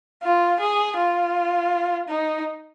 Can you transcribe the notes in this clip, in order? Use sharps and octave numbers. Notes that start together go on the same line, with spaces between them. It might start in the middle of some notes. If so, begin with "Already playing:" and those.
F4
G#4
F4
D#4